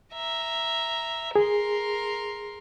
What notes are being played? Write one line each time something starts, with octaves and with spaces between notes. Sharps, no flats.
E5 A#5
G#4 A#4 C6